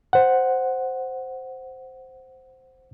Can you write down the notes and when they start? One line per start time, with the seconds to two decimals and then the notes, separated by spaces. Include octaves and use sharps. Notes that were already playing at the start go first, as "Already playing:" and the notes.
0.13 C5 F#5